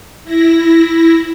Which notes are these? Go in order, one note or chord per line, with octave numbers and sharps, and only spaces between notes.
E4 A#6